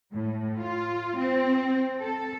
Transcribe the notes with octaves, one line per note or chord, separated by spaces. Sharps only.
A2
F4
C4
A4